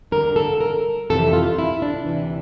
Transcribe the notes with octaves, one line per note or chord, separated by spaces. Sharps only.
G2 D3 A#4
A4
A#4
F2 C3 E3 A4
F4
E4
D4
D2 C3 E3